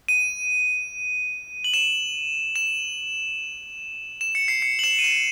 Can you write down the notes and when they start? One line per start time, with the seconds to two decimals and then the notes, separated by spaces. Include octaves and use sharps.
0.08 D#7
1.64 F#7
1.74 E7
2.56 E7
4.21 E7
4.35 C#7
4.48 C7
4.62 C#7
4.79 F#7
4.84 E7
4.99 D#7
5.04 E7